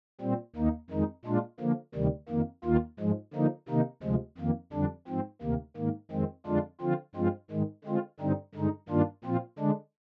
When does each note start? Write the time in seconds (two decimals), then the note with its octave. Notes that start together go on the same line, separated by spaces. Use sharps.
0.21 A#2 G3 C4
0.56 D#2 D#3 A#3 D#4
0.90 F2 D#3 G#3 D#4
1.25 A#2 G#3 D4 F4
1.60 D3 F3 A#3
1.95 D2 C3 D#3 G3
2.29 F2 D#3 A#3
2.64 D#2 D#3 A#3 F4
2.99 G#2 F3 G#3
3.34 D3 F3 A#3 D#4
3.69 C3 D#3 A#3 D#4
4.03 D2 C3 F3 G#3
4.38 F2 D#3 A#3
4.73 F2 D3 G3 D4
5.08 G#2 F3 C4
5.42 D2 C3 D#3 A#3
5.77 G#2 D#3 A#3
6.11 F2 D#3 G#3 C4
6.46 F2 D3 G#3 D4 F4
6.81 D3 F3 C4 F4
7.15 G2 F3 G#3 C4 F4
7.50 G#2 D#3 G#3
7.85 D3 G#3 C4 F4
8.20 G2 D3 G3 C4 D#4
8.55 G2 D3 G#3 D#4
8.89 G2 D#3 A#3 D4 F4
9.24 A#2 F3 C4 F4
9.59 D3 G#3 D4